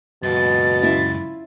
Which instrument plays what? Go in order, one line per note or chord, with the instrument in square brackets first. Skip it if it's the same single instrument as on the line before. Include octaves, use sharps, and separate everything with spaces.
[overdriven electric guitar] C#2 F#2 [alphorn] B2 [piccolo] A6
[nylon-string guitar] C#4 E4 F4